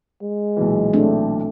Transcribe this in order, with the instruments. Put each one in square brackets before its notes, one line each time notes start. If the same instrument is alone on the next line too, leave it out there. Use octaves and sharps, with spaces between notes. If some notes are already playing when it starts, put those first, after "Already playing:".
[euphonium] G#3
[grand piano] B1 A#2 E3
[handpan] A3 C4 D4